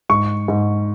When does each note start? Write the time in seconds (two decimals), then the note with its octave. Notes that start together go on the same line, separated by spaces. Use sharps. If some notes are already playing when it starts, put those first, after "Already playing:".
0.09 G#2 C#6
0.48 G#2